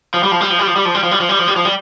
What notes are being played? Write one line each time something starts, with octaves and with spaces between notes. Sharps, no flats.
F3
G3
F3
G3
F3
G3
F3
G3
F3
G3
F3
G3
F3
G3
F3
G3
F3
G3